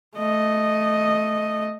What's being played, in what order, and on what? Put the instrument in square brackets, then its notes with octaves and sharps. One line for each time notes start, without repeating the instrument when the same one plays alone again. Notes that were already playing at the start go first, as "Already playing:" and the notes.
[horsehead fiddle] A3 D#5